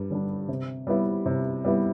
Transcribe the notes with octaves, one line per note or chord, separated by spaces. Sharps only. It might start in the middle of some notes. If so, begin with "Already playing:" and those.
Already playing: G2 G3
D3 G3 D4
C3
G3 B3 E4
C3
G3 B3 E4